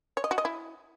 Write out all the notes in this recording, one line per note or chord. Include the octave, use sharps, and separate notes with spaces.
C#5
D#5
F#4
D#5
E4